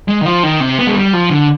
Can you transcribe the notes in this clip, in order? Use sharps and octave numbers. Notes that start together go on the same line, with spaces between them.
G#3
D#3
F3
D#3
C3
B3
G#3
G3
F3
D3